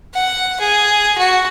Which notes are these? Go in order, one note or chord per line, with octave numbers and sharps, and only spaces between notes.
F#5
G#4
F#4